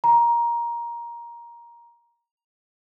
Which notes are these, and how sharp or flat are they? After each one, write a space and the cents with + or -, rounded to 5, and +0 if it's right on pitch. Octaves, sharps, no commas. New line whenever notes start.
A#5 +15